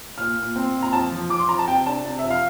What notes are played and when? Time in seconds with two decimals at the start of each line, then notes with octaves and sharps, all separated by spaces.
0.18 A#2 F6
0.37 A#2
0.56 C4
0.74 A#2
0.83 A#5
0.93 F2 A5
1.12 F3
1.30 F3 D6
1.39 C6
1.49 F2 A#5
1.59 A5
1.68 C3 G5
1.86 D4 A5
2.05 C3
2.19 F2 E5
2.30 F5